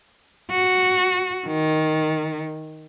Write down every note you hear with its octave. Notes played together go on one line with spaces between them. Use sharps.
F#4
D#3